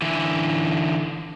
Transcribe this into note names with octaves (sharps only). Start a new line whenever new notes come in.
D3 E3